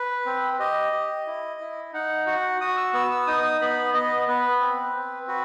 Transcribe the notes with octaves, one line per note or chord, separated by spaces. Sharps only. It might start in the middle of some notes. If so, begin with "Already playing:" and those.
Already playing: B4
C4
G4 D#5
G4
E4
E4
D#4 F#5
F#4 F#5
F#4 D#6
E6
B3 E6
E6
D#4 D#6
B3 B5
B3 D#5
B3 B4
C4
C4
F#4 B4